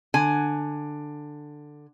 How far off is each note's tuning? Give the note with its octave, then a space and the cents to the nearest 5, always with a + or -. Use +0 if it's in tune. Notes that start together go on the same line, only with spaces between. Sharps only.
D3 +10 G#5 +5